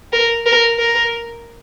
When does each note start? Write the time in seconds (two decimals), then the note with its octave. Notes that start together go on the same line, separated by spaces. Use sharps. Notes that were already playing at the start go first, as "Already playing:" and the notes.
0.13 A#4
0.46 A#4
0.79 A#4